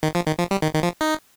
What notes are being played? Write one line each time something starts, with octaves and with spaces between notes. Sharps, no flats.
D#3
F3
D#3
F3
G3
D#3
D#3
F3
D#4